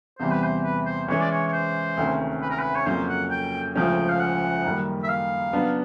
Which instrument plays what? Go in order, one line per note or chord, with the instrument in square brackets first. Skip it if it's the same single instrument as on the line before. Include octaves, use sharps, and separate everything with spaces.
[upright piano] E2 C3 E3 G3 [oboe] C5
[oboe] B4
C5
B4
C5
[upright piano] E3 G#3 C#4 [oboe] C#5
[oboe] D5
C#5
C#5
C5
[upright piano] D2 C3 D#3 G#3 C#4
[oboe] B4
A#4
B4
C#5
[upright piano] F2 C#3 F#3 A#3 C#4 [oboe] C5
[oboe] F#5
G5
[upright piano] D2 C#3 F3 G#3 C#4 [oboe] G5
[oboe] F5
F#5
[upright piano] F#2 D#3 G3 A#3
[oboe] E5
F5
[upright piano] C#3 F#3 B3 D4